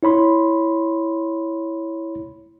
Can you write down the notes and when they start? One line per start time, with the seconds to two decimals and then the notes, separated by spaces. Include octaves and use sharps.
0.03 E4 C#5 B5 C6